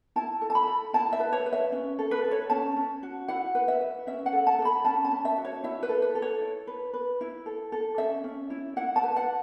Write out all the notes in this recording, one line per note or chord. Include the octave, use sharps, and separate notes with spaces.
E4 A5
A4
A5
B5
A4
E4 A5
E5
B4
C#5
B4
E5
C#4
A4
B4
A4
C#5
C#4 A5
C#4
F#4
E4 F#5
B4
E5
B4
C#4 E5
F#5
A4
A5
A4
B5
C#4 A5
A5
C#4
E5
F#4
C#5
E4 E5
B4
A4
B4
A4
C#5
E4
B4
B4
E4
A4
A4
C#4 E5
C#4
E4
E4 F#5
A5
B4
F#5